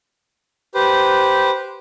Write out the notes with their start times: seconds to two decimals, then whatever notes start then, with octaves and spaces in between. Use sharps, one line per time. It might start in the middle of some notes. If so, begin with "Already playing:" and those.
0.75 G4 B4 C5